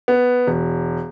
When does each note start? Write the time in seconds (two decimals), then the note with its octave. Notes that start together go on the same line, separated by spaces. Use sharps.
0.08 B3
0.47 E1